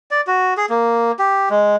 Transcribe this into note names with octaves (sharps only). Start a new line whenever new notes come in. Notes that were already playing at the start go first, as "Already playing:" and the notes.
D5
F#4
G#4
A#3
G4
G#3